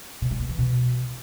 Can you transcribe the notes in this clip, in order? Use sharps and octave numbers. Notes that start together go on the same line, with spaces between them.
B2
G#3
B3
E3
B2